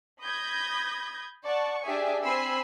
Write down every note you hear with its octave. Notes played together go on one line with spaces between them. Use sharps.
B5 D#6 G6 G#6 A#6
D5 F#5 A5 C#6
D4 G4 G#4 E5 G#5
C4 G#5 B5 E6 C7